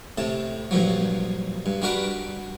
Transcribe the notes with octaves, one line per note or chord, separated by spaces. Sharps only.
A2 C3 A5
G2 A#2 F3 F#3
G2
G3 D4 F#4 A#4 B4